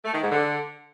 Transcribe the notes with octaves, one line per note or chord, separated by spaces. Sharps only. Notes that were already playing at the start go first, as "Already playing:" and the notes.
A3
D#3
G#2
D3